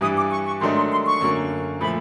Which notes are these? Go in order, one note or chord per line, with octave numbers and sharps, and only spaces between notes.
G2 E3 G3 D#6
D6
C#6
C#6
G#2 D#3 F#3 A3 D4 C6
C6
C6
C#6
F#2 D3 F#3 A#3
A#2 F3 A3 B5